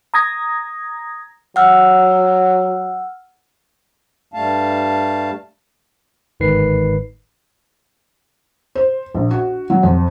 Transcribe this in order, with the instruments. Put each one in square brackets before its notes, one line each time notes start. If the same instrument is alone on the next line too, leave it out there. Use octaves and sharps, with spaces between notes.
[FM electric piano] A#5 D#6 G#6 A#6
[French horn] F#3 [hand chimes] F#5 E6 F6
[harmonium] G2 G3 A3 F5 A5
[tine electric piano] G1 G#2 D#3 B4 C7
[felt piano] C5
A#1
F#4
F#3
F2